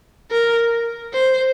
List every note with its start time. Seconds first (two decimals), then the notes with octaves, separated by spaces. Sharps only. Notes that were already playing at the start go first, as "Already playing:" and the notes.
0.31 A#4
1.13 C5